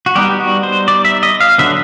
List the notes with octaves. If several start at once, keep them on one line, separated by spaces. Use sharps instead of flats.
F#4
G3 B3 D#4 G4
F#4
C5
D5
E5
D#5
F5
D3 F#3 B3 E5